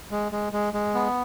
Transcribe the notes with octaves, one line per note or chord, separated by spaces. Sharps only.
G#3
G#3
G#3
G#3
B3